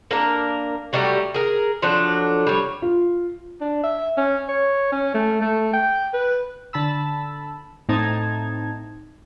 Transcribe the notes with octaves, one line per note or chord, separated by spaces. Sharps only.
A#3 D4 A#4
F#3 G3 A3 G4
G#4 A#4
F3 F#3 D4 A4
G3 C#5
F4
D4
E5
C#4
C#5
C#4
A3
A3
G5
B4
D3 A5 B5 E6
A2 C4 D#4 A5 G#6